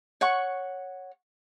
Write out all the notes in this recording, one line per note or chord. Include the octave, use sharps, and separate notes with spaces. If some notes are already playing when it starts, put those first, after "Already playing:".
C#5 F#5 C#6